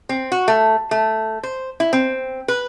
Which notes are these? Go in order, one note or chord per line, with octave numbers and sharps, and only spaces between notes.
C4
F#4
A3
A3
C5
E4
C4
B4